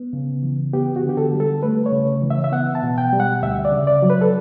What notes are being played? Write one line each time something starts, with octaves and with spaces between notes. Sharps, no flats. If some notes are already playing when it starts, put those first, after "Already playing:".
Already playing: B3
C#3
E3
B3 G4
F#4
D3
G4
A4
G3
A4
A3 B4
C#5
C#3
E3
E5
E5
B3 F#5
A5
B2
G5
G3
F#5
D2 E5
D5
C#3
D5
F#3
B4
A4